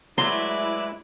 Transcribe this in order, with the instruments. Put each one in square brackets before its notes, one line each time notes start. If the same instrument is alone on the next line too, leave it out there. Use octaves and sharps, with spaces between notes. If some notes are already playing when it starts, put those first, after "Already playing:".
[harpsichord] F#3 A3 [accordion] G#3 E4 [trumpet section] B4 D5 E5 [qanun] C6